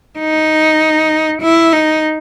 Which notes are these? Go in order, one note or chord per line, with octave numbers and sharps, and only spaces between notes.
D#4
E4
D#4